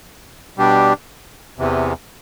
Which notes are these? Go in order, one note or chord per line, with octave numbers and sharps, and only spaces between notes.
B2 G3 D4 G4
E2 C3 E3